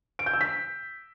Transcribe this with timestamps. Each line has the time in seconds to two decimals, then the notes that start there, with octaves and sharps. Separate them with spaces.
0.19 D7
0.26 G6
0.33 E6
0.41 B6